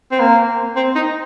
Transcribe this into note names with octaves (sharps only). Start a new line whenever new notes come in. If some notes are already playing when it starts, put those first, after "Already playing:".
C4
A#3
C4
D#4